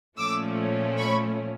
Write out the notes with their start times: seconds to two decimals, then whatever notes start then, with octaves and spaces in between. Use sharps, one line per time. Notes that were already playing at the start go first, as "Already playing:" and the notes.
0.17 A#2 F3 A3 C#4 D6 E6
0.97 B5 C#6